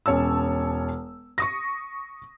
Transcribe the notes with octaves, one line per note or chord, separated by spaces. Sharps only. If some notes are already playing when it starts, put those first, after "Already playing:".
E1 C#4 C#5 A5 E6
C#6 D#6 A#6